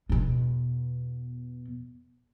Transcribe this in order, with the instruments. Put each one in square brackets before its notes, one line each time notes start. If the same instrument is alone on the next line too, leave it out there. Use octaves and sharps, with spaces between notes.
[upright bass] E2 B2